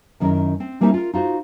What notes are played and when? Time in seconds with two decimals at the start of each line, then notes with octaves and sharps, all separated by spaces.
0.20 F#2 D#3 B3 C#4 E4 A#4
0.60 C4
0.81 G3 A#3 C4 C#4 D#4 E4
0.94 F4 A#4
1.13 D#4 F4 F#4 C5